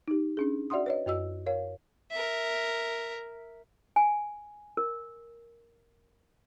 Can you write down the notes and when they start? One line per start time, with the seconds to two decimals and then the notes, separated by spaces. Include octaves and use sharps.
0.08 D#4 G4
0.37 C#4 D4 G#4
0.70 F#4 D5 E5 F#5 C6 D#6
0.86 B4 C#5 D#5
1.06 F#2 F#4 D#5 E6
1.46 A#4 C#5 F5
2.11 A#4 E5
3.96 G#5
4.77 A#4